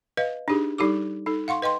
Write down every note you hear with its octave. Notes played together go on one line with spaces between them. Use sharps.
B4 D#5 F5
D4 D#4 G4 G#4
G3 D#4 G4 A4 D6
D#4 A4
F5 F#5 C6 C#6
B4 D#5 G5 C6